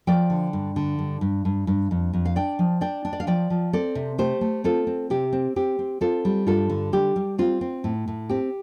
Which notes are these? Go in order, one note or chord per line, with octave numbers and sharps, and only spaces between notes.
F3 D5 G5
D3
G2
D3
G2
G2
G2
G2
F2
F2
F5
D4 D5 G5
F3
D4 D5 G5
D4
D5
F5
F3 D5 G5
F3
C4 A4 D5
C3
A3 G4 C5
A3
C4 F4 A4
C4
C3 G4
C4
C4 G4
C4
C4 F4 A4
G3
G2 F4 A4
D3
G3 G4
G3
C4 F4
C4
A2
A2
C4 G4